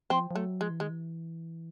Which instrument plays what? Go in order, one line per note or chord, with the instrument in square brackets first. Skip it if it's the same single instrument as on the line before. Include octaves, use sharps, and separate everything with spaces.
[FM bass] F3 [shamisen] C4
[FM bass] F3
[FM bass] F#3 [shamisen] A3
[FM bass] F3 [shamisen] G#3
[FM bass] E3
[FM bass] D#3 [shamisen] G#3
[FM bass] E3